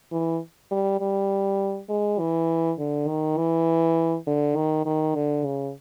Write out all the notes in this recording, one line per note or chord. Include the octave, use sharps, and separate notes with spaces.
E3
G3
G3
G#3
E3
D3
D#3
E3
D3
D#3
D#3
D3
C#3